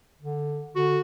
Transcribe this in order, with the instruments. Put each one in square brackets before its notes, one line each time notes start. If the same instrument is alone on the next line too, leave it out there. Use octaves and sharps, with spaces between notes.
[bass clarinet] D3
[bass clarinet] D3 [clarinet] F#4